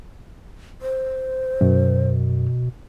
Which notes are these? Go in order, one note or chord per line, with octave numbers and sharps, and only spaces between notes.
C5
F#2 B2